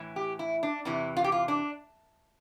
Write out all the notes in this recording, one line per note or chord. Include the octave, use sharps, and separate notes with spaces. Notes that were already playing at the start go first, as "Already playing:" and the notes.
Already playing: A2 E3
G4
E4
D4
E2 C3 E3 E4
F4
G4
F4
D4